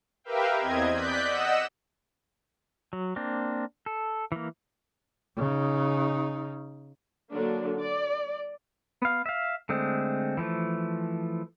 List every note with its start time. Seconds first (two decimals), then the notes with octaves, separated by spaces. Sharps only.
0.24 G4 A#4 B4 E5 F5 G5
0.59 E2 C4 D#5 G#6
0.91 D5 F#6 G6 B6
1.25 D#5 F#5 E6 E7
2.93 F#3
3.16 A#3 C4 D4
3.86 A4
4.32 E3 A#3
5.37 C#3 D#4
7.32 D3 F#3 A#3 D4
7.80 D5
9.02 B3 F5
9.26 E5 F5
9.69 D3 G#3 A3 C4
10.37 E3 F3 A3